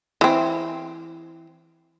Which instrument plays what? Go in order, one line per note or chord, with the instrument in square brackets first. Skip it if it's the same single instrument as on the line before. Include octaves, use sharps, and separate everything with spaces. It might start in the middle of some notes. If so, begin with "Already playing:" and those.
[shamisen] E3 C4